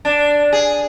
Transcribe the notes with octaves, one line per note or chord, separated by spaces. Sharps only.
D4
G#4